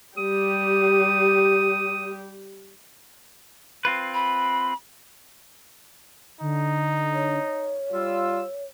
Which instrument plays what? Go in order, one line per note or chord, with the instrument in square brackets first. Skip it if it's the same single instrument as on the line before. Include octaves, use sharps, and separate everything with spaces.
[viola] G3 G4 [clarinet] D#6
[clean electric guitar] C4 F4 B4
[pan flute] B5
[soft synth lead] D3 [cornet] D#4
[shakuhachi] C#5
[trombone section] G3 F4 [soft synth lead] E6